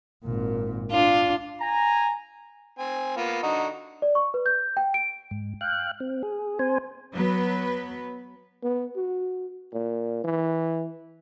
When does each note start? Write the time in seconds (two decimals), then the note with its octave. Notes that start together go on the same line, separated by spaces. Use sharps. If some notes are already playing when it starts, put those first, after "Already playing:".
0.24 G#1 A#2
0.91 D4 F4
1.61 G#5 A#5
2.79 C4 G#5
3.17 A#3 B3 F4
3.43 D3 D#4 F#4
4.02 D5
4.15 C#6
4.34 B4
4.46 G6
4.77 G5
4.94 D7
5.31 G#2
5.61 F5 G5 F#6
6.00 C4
6.23 G#4
6.59 C4 C5 G#5
7.13 F#3 B3 B4
8.63 B3
8.96 F#4
9.74 A#2
10.24 E3